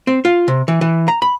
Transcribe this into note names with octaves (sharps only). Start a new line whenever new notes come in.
C4
F4
C3
E3
E3
A#5
B5